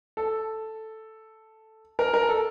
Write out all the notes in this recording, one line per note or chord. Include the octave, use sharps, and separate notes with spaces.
A4
A#4
A#4
A4